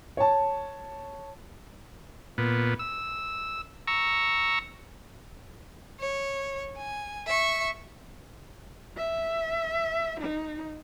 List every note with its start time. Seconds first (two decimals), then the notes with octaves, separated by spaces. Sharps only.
0.17 C#5 A5
2.38 A#2 B3
2.79 E6
3.87 A#5 C#6 E6
6.00 C#5
6.77 G#5
7.26 E5 C#6
8.97 E5
10.20 D#4